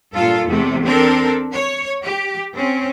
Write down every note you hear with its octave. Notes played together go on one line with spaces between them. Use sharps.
G2 A#2 F4 A4
E2 C3 A3
C4 D4 A4 A#4
C#5
G4
C4 C#4